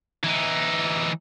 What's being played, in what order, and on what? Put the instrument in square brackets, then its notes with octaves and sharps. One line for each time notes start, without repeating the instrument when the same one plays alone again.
[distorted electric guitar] E3 D#4